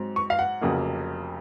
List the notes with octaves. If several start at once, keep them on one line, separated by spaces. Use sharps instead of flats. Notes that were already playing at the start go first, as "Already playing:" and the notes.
Already playing: G#2 F#3 C4
C#6
F5
F#5
F1 F2 C#3 F#3 A#3